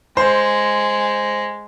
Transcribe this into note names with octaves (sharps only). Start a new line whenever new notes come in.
G#3 C5